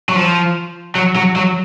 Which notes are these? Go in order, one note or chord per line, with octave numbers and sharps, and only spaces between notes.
F#3
F3
F#3
F#3
F#3